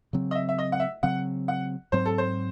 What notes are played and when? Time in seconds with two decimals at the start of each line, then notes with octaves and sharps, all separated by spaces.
0.13 C#3 F#3 C4
0.31 D#5
0.35 E5
0.49 E5
0.58 D#5
0.72 F#5
0.80 E5
1.03 C#3 F#3 C4 F#5
1.48 F#5
1.92 G#2 F#3 C4 C5
2.05 A4
2.18 C5